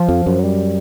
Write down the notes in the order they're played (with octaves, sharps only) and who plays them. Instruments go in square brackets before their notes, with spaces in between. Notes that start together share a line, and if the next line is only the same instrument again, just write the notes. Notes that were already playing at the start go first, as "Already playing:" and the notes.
Already playing: [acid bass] F3
[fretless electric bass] F2
F#2
[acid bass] F#3
G3